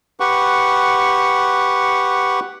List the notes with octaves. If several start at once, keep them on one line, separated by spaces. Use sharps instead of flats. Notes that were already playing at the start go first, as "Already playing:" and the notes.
G4 B4 F#5 C#6